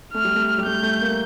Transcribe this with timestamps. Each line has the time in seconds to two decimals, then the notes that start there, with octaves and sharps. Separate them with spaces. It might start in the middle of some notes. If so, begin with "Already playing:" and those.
0.14 A3 F6
0.24 G3
0.36 A3
0.58 G3
0.66 A3 G6
0.83 A3
1.01 A#3